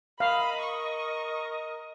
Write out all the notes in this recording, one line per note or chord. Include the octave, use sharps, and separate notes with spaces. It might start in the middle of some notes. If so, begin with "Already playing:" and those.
A#4 D#5 F5 B5
C#6